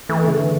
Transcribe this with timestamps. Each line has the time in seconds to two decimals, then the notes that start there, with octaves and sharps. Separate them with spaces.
0.09 E3 A3
0.23 C#3 A3
0.38 D3 E3